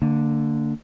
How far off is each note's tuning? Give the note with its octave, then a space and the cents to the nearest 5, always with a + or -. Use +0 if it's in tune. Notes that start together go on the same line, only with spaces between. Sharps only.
D3 +0 A#3 -35